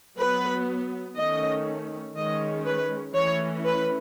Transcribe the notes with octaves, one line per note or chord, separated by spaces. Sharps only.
F#3 B3 B4
D#3 A3 C#4 D#5
D#3 G#3 C#4 D#5
B4
E3 A3 C#4 C#5
B4